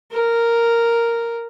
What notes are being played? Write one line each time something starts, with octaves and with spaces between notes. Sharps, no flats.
A#4